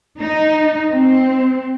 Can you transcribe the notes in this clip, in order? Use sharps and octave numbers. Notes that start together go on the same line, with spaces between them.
D#4
C4